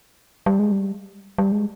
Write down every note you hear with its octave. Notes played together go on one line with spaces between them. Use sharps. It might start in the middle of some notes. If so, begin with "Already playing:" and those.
G3
G#3
G3
G3
G#3